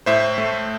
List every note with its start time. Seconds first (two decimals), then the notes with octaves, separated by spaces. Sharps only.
0.06 A2 C5 E5
0.38 A3